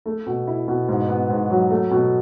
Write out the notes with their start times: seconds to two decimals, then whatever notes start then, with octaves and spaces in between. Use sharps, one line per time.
0.06 A3
0.27 B2
0.47 E4
0.68 B2
0.88 G#2
1.09 B3
1.29 G#2
1.50 F#3
1.70 A3
1.91 B2